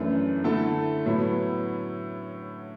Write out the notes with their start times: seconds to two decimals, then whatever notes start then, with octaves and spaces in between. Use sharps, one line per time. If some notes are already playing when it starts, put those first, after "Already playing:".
Already playing: F#2 E3 A3 D4
0.44 D3 A3 E4 A4
1.06 A2 F#3 B3 E4